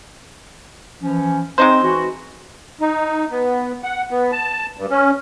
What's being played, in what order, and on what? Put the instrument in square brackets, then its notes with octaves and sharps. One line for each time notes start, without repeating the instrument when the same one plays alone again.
[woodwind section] E3 F3 C#4
[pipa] G#3 D#4 C5 [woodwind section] C4
[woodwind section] E3 C4 F#4
[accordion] D#4
B3
F#5
B3
A5
G2
C#4